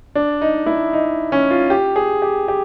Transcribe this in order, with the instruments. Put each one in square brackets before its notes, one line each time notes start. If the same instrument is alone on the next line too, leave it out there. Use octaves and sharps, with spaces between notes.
[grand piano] D4
D#4
E4
D#4
C#4
F4
G4
G#4
G4
G4